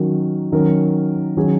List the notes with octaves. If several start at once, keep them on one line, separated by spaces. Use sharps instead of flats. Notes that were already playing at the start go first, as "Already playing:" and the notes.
Already playing: D#3 F#3 C#4 F#4 A#4
D#3 F#3 C#4 A#4
D#3 F#3 C#4 G#4